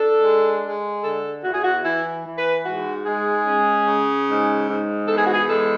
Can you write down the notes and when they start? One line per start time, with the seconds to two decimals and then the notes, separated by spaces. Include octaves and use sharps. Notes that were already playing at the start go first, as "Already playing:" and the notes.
Already playing: D4 A4
0.22 G#3
0.63 G#3
1.03 D3 A4
1.43 E2 F#4
1.54 G#4
1.64 F#4
1.84 E3 E4
2.25 E3
2.38 B4
2.65 G#2 F#4
3.06 G#3 G#4
3.46 C#4
3.87 C#3
4.28 G#2
4.68 G#2
5.08 E2 A4
5.17 G#4
5.26 F#4
5.34 G#4
5.49 G#3 A4